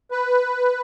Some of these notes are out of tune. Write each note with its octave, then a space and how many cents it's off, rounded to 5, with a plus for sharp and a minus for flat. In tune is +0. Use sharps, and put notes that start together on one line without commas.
B4 +5